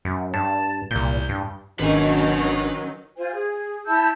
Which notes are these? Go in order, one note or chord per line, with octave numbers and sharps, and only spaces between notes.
F#2
G2 A5
C2 A#2 G6
G2
G#1 B2 D#3 F#3 C#4 D4 B4 G#5
F4 C5 G#5
G#4
E4 A5 E6 G6